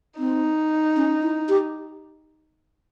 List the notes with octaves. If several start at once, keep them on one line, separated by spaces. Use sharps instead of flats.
C4 D#4
C#4
E4
G4